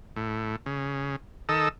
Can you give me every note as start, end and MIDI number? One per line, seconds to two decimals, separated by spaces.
0.16 0.56 45
0.66 1.16 49
1.49 1.69 51
1.49 1.69 69
1.49 1.69 75
1.49 1.69 88